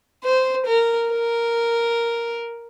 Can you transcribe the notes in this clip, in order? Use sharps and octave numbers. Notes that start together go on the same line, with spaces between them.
C5
A#4
A#4